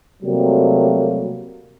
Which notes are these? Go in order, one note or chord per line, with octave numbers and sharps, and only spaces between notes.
C3 F#3 G3 A3 A#3